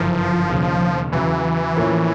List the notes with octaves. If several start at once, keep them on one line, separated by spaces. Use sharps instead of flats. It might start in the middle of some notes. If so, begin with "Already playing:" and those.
Already playing: G1 F#2 C#3 E3 F3
E1 D#2 C#3
E2 C#3 E3 F#3
A2 F3 A#3 C#4